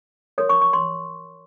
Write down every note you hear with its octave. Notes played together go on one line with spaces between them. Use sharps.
F#4 A#4 C#5 D#6
C#6
C#6
C6